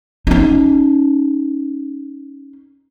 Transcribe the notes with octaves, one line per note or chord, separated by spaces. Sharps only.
C#4 D#4